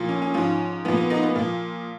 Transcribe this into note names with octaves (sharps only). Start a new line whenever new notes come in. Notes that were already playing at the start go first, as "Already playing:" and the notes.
Already playing: A#2 F3
C#4
C#4
G#2 F3 C#4
A#2 F3 B3
B3
B3 D#4
B3
A#2 F3